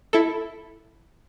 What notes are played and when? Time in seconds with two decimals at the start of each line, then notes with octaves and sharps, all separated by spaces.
0.13 E4 A4